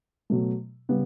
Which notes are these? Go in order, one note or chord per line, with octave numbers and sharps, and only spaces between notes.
B2 F#3 A3
C#3 G3 B3